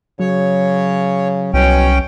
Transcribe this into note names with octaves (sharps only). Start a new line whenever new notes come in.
C#3 F#3 C#5
C2 B2 C#4 G5